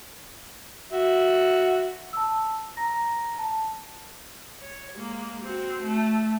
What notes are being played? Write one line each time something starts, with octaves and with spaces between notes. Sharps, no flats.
F#4 E5
A5 E6
A#5 A#6
A5
C#5
G#3 A#3
C4 F#4
A3